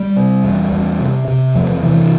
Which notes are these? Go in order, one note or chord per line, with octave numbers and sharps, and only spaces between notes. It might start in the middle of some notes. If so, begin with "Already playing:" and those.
Already playing: G3
C3
E2
E2
C3
C3
E2 F3
C3 E3